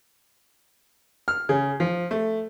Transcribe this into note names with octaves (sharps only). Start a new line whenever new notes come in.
F6
C#3
F3
A3